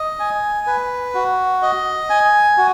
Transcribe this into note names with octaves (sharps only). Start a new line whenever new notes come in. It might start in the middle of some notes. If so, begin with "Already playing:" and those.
Already playing: D#5
G#5
B4
F#4
D#5
G#5
F#4